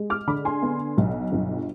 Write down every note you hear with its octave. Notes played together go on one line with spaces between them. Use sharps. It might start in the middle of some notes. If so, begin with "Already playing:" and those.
Already playing: G#3
D6 F6
D3 B5 D6
G#5 C6
B3
B1
G1